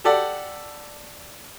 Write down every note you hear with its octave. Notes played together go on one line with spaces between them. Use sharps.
G4 A4 D5 F#5